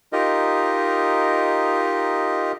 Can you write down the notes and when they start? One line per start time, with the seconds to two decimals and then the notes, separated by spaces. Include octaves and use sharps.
0.13 D#4 F4 G4 A#4 D#5